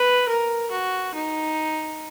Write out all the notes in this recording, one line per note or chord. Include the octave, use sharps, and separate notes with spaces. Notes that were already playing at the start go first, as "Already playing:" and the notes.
Already playing: B4
A#4
F#4
D#4